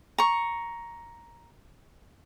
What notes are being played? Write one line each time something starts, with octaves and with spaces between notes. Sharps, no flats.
A#5 C#6